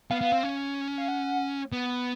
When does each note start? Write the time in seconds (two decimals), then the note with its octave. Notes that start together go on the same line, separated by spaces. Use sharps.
0.11 B3 F5
0.21 B3
0.32 C4
0.43 C#4
0.98 F5
1.08 F#5
1.72 B3